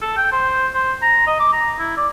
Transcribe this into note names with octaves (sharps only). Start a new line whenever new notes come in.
A4
G5
C5
C5
A#5
D#5
D6
A#5
E4
D5